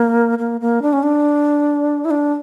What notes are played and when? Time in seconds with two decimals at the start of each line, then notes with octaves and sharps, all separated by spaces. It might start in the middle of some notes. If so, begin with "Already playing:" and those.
Already playing: A#3
0.39 A#3
0.61 A#3
0.82 D4
0.93 C#4
1.03 D4
2.05 E4
2.11 D4